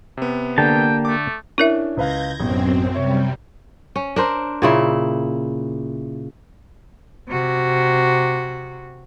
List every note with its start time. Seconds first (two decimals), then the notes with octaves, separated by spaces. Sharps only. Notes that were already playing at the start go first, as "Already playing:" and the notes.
0.17 C3 B3
0.58 D3 A#3 G4 G5 A5
1.05 A3 D6
1.58 C#4 D4 E4 A#4 E5
1.97 C#2 B4 F5 G6 G#6 A#6
2.40 A1 F#2 B2 C4
2.94 C3 G3 C#5 E5
3.96 C#4
4.16 D4 A#4 C5
4.62 A#2 C#3 E4
7.28 C3 F#4